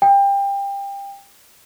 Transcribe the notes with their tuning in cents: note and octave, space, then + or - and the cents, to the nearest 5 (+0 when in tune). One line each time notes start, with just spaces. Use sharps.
G5 +25